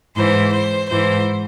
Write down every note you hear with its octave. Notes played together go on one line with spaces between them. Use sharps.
G#2 E3 C5
C5
G#2 E3 C5